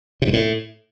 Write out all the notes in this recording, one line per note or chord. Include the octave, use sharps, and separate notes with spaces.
C3
G2
A2